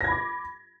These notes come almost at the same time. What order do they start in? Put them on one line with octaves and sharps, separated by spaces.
A#6 G#6 B5 D6